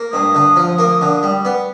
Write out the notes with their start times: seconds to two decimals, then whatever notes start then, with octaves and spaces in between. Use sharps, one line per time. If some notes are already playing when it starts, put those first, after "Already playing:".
Already playing: A#3
0.12 G2 D#6
0.35 D3
0.56 F3
0.79 A#3
1.01 D3
1.23 G3
1.45 B3